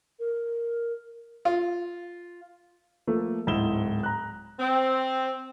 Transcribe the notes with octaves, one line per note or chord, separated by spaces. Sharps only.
A#4
F4
F3 A3 A#3
D1 G#2 E4 E7 G7
A#5 F#6
C4